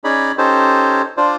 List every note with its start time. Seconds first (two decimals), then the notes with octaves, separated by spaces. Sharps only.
0.04 C#4 D#4 G#4 D5 B5
0.38 C#4 D#4 G4 A4 C5
1.17 D4 F4 C5 D5